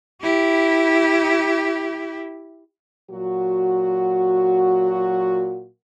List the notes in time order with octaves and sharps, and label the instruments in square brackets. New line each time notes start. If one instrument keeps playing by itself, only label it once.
[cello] E4 G4
[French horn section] A#2 F#3 F#4